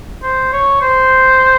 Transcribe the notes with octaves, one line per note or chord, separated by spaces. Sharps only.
C5
C#5
C5